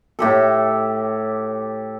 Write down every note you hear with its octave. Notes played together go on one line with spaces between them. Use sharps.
A2 G4 A4